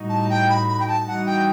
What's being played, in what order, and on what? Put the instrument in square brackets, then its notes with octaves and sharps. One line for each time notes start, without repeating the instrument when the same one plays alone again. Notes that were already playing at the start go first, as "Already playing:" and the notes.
Already playing: [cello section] A2 G3 D#4 F#4
[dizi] A5
G5
B5
B5
G5
A5
[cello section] E3 G3 D#4 F#4 [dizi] F#5
[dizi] G5